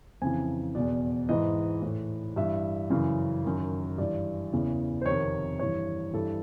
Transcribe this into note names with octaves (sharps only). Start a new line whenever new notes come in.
F2 C#3 E3 G#5
E2 B2 D5
G#2 E3 D#5
A2 E3
G2 E3 E5
F#2 C#3 E3
F#2 D#3
G2 E3 D5
E2 C#3 E3
C5
F2 C3 D#3 C#5
G2 E3 C#5
G2 E3 A4